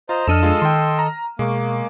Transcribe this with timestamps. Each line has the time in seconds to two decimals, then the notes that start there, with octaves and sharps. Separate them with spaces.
0.09 F4 C5 D#5 A#5
0.28 F2 D4 A4 D#5 E6 F6 D#7 E7
0.43 G#3 F4
0.62 D#3 G5 C6
0.99 A#5
1.39 B2 G#3 A#3 C#6 D6